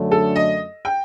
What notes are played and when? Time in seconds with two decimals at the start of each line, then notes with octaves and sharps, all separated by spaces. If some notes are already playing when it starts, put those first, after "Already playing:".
Already playing: F#2 D3 F#3 A3 D4
0.11 A4
0.36 D#5
0.85 G5